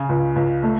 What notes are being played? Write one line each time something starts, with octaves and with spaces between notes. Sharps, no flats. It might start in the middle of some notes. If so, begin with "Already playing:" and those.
Already playing: C#3
C#2
C#2
A3